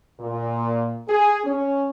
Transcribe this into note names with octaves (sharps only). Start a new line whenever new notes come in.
A#2
G#4
C#4